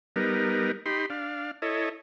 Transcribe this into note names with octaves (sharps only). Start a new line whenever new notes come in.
G3 B3 D#4 A#4
D#4 G4 B5 C6
D4 F5
E4 A4 C#5 D#5